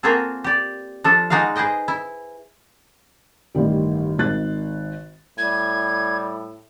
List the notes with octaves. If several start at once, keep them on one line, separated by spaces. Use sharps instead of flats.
A#3 C4 F4 F#4 G#4 A4
G4 D5
F3 D4 A4
G#3 D#4 F#4 D5 F5
G#4 B4 C5 D#5 G5
E4
A1 G2 D#3 G3
G#1 D#3 F#6 A6
A2 G3 G#6